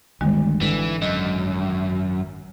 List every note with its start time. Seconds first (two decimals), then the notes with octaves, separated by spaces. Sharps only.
0.21 G1 D2 D#3 G3 G#3
0.61 G#1 D3 E3
1.02 F#2 D#5